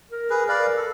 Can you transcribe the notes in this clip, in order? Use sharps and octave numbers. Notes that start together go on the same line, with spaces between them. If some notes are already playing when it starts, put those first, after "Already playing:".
A#4
G#4 B4
A#4 B4 D5 F5
A4